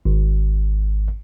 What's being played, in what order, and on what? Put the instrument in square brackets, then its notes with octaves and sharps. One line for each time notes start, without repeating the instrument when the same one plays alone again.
[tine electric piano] G#1